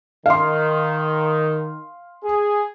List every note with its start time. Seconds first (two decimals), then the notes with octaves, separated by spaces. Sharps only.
0.26 D#3 F5 C6
2.24 G#4